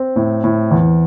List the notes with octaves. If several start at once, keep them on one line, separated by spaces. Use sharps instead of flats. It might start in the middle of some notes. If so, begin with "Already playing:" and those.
Already playing: C4
A2
A2
E2